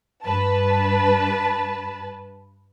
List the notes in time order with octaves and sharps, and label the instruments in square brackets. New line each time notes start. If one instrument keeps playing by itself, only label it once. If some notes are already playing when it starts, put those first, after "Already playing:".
[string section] G2 B4 A5